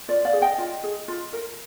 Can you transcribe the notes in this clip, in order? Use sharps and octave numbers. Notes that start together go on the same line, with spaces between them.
F4 D5
D5 F5
G#4
D#5 G5
F4
G#4
F4
A#4